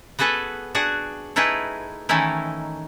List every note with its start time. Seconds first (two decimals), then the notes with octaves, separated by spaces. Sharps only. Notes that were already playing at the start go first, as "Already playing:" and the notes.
0.19 B3 F#4 G#4 A4 B4
0.75 D4 F#4 G#4 F#5
1.36 A3 D#4 E4 G#4 B4
2.09 D#3 E3 A3 C#4 D#4 E4